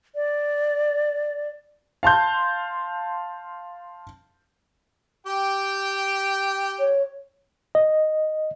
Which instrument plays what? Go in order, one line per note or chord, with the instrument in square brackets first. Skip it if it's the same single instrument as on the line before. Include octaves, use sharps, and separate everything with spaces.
[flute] D5
[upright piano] F5 A5 C6 G6
[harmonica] G4 G5
[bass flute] C#5
[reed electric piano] D#5